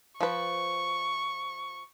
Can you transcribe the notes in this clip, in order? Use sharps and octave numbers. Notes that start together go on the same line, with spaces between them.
F3 B4 C#6